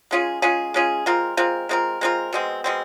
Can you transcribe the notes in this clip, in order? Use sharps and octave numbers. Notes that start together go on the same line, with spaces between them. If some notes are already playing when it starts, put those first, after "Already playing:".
G#3 C#4 F4 G#4
G#3 C#4 F4 G#4
G#3 C#4 F4 G#4
G#3 C4 F4 A#4
G#3 C4 F4 A#4
G#3 C4 F4 A#4
G#3 C4 F4 A#4
B2 G#3 C4
B2 G#3 C4